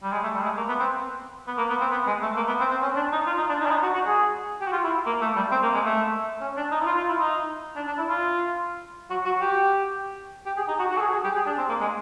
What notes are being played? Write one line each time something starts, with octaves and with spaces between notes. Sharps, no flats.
G3
G#3
A3
G3
G#3
A3
A#3
B3
C4
B3
A#3
B3
C4
B3
G#3
A3
A#3
B3
C4
C4
C#4
D4
D#4
F4
D#4
D4
D#4
D4
D#4
F#4
F#4
G#4
G4
F#4
F4
E4
A#3
A3
G3
C4
A#3
G#3
A3
C#4
D4
D#4
E4
F4
F4
E4
D#4
D4
D4
E4
F4
F#4
F#4
G4
G4
G#4
D#4
F#4
F#4
A4
G#4
G#4
G4
G#4
D4
C4
A#3
G#3